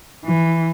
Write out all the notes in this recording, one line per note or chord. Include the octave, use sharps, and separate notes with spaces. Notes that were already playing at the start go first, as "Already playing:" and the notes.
E3